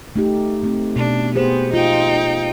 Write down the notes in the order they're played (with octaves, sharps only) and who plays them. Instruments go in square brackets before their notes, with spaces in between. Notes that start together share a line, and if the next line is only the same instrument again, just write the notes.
[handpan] A3 D#4 G4
A3 C4
[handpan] B2 [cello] D4
[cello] B3 [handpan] G4 G#4 C5
[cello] D#4 G5 [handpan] F4